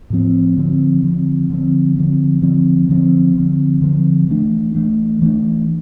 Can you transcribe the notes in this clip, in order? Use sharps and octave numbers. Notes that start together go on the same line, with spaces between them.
A2 F3 C4
D3 F3 C4
D3 F3 C4
D3 F3 C4
D3 F3 C4
D3 F3 C4
D3 F3 C4
D3 F3 C4
D3 F3 C4
E3 A3 D4
E3 A3 D4
E3 A3 D4